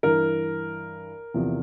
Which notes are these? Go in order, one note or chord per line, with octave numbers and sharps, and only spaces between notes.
G2 E3 A#4
E2 C3 F3